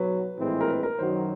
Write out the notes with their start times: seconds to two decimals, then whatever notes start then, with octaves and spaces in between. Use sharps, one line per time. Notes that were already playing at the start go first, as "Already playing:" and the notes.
Already playing: B1 F#3 B4
0.37 A#1 A2 E3 G#3 C4
0.61 A#4
0.68 B4
0.83 A#4
0.99 F#2 D#3 F#3 C5